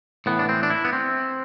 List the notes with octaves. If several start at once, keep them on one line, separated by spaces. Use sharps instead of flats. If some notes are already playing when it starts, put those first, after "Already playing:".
A2 E3 B3
D4
C4
D4
E4
B3
C4